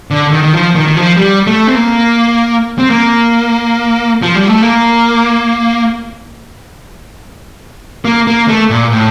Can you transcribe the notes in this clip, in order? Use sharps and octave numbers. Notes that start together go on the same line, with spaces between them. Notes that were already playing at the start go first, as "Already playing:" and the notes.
D3
D#3
D#3
F3
D#3
D#3
F3
G3
A3
C4
A#3
C4
A#3
F3
G3
A3
A#3
A#3
A#3
A3
A#2
A2